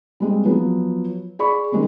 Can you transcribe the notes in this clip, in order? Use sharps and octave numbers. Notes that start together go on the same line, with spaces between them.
G3 G#3 C4
F3 F#3 B3
G#4 D5 B5 C#6
D#3 G3 G#3 C4 C#4